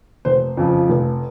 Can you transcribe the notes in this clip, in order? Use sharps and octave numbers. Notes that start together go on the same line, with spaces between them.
F1 C5
F2 C#3 F3
F1